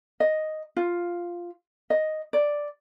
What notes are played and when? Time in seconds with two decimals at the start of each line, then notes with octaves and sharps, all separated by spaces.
0.20 D#5
0.77 F4
1.90 D#5
2.33 D5